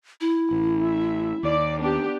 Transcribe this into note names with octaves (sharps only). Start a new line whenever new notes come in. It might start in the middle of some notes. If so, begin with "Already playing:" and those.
E4
A1
E5
D#2 D5
B3 D4 G4